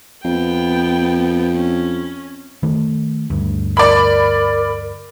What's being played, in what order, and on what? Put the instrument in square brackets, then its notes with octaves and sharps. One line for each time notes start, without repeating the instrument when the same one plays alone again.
[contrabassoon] F2 [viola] B3 G5
[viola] C#4
[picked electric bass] D#3 A3
D2 G2
[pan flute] A#4 [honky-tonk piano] D5 B5